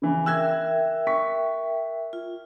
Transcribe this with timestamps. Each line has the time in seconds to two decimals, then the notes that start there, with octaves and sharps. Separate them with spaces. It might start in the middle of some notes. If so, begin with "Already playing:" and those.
0.02 C#3 E3
0.26 A#4 E5 G5 E6 F#6 G#6
1.07 C#6 B6
2.13 F4